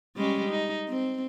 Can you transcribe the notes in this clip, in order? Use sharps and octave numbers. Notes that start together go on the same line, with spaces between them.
G3 G#3 C#4
D#4
C4